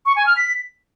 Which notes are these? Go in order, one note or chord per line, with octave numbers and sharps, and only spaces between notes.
C#6
G#5
F6
B6